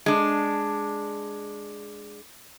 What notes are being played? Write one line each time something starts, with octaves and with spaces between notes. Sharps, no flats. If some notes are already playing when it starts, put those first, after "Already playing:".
G#3 D4